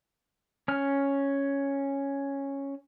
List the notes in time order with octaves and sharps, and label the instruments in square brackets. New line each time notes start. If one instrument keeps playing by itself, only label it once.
[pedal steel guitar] C#4 F6